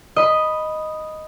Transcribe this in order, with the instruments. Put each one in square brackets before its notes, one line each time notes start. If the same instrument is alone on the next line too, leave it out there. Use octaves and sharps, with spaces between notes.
[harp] D#5 B5